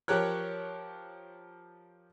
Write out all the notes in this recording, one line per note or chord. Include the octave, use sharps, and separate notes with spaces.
F3 G4 A#4 C#5 F#6